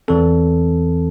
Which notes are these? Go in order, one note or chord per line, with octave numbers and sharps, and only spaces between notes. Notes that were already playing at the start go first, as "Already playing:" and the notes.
E2 E3 C4 A4